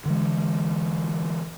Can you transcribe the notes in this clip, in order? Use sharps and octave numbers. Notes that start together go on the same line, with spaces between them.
D3 E3 G#3